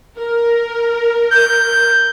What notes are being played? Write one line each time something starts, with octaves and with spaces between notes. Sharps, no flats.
A#4
G6